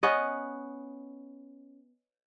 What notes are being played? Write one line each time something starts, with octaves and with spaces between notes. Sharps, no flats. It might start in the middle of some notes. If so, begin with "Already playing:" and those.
B3 C#4 D#5